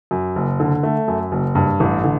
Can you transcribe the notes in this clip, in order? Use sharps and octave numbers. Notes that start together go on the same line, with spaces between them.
F#2
F#1
D3
A3
F#2
F#1
G2
A1
D3